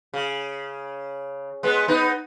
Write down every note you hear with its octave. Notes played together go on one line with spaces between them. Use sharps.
C#3
G#3 B3
B3 D#4